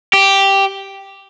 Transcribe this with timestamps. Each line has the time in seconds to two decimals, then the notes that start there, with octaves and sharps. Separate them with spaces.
0.13 G4